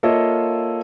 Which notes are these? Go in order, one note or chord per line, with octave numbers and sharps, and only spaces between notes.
A#3 F4 A4 C#5 D#5 E5